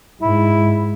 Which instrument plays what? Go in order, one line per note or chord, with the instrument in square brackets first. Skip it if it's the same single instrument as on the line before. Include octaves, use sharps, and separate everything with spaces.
[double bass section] G#2 [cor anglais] E4